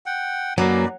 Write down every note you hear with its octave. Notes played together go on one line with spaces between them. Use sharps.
F#5 G5
F#2 F#3 A#3 D#4 B4 D5